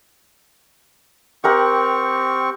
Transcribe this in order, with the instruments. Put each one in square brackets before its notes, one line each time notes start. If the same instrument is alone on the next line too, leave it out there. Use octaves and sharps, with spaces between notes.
[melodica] C4 C#6 [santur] G4 A#4 F#5